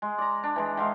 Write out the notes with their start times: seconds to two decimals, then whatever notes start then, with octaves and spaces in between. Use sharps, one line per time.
0.02 G#3
0.18 D5 A#5
0.43 D4
0.56 E3 G#3
0.77 D#3 G#3 F5